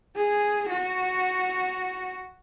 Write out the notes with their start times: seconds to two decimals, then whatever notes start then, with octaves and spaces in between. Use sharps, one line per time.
0.16 G#4
0.69 F#4